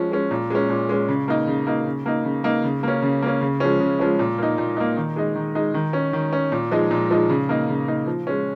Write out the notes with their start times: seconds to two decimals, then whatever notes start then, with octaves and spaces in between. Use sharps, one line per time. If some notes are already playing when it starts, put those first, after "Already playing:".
Already playing: F3 G#3 C#4
0.11 G#3 C#4
0.31 A#2
0.50 G#3 C#4
0.69 A#2
0.89 G#3 C#4
1.08 C#3
1.28 A#3 D#4
1.47 C#3
1.67 A#3 D#4
1.86 C#3
2.06 A#3 D#4
2.25 C#3
2.44 A#3 D#4
2.64 C#3
2.83 A#3 C#4
3.02 C#3
3.22 A#3 C#4
3.41 C#3
3.60 F3 G#3 C#4
3.80 C#3
4.00 F3 G#3 C#4
4.19 A#2
4.38 A#3 D#4
4.58 A#2
4.77 A#3 D#4
4.97 D#3
5.16 G#3 D#4
5.35 D#3
5.55 G#3 D#4
5.74 D#3
5.93 C#4
6.13 D#3
6.33 C#4
6.52 A#2
6.71 F3 G#3 D#4
6.91 A#2
7.10 F3 G#3 D#4
7.29 C#3
7.49 A#3 D#4
7.69 C#3
7.88 A#3 D#4
8.07 F3
8.27 G#3 C#4